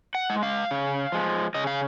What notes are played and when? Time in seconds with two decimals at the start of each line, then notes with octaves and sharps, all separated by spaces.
0.15 F#5
0.30 G#3
0.43 F5
0.71 C#3
1.12 F3 G#3
1.54 C#3 D#5
1.67 F5